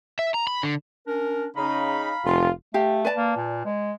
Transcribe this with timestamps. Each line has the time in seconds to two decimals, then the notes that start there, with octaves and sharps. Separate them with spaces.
0.19 E5
0.34 A#5
0.47 B5
0.63 D3
1.07 C#4 D4 A#4
1.56 C#3 D#4 F5 A#5 B5
2.25 F1 F4
2.74 A3 G4 F5
3.05 B4 D5 A5
3.17 A#3
3.36 A#2
3.65 G#3